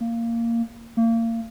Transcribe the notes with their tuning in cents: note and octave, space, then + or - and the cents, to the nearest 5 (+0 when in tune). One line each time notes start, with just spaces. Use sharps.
A#3 -10
A#3 -30